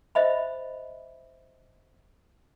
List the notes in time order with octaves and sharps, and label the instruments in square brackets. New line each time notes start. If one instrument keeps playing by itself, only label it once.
[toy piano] C5 D#5 E5 B5